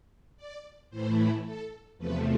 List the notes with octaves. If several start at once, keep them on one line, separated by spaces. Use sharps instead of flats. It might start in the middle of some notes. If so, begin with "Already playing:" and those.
D5
A2 E3 A3 E4 C5
A4
E2 C3 F3 A3 B4